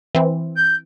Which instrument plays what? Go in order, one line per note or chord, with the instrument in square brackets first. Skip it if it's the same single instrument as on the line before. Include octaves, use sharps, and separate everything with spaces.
[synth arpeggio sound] E3 C4
[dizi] G6